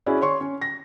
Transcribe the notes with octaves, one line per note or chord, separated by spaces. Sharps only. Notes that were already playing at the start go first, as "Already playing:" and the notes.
C#4 E4 F#4 G#4 D5
C#5 C6 C#6
C#4
A#6